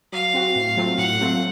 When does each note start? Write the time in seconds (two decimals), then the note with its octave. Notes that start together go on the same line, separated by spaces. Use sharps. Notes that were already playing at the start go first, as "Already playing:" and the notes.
0.12 F#3 F5
0.34 C4 F#4
0.56 A2
0.77 F#3 A3 C4 F4
0.98 A2 F#5
1.20 F#3 A3 C4 F4